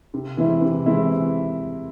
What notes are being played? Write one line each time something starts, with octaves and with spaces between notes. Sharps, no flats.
C3
E3 G#3 C4 E4
C3
E3 G#3 C4 E4